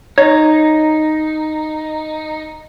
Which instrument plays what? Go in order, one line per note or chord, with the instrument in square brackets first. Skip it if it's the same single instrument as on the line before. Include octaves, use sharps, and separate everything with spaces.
[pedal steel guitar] D#4 [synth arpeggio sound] C#5